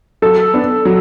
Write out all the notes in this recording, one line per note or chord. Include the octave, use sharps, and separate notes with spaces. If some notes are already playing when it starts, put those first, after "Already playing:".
F#3 A4
B3 D4
F#3